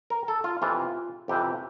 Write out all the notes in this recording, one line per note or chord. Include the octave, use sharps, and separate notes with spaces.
A#4
A4
F4
F2 C3 E3 F4
F2 C3 E3 G4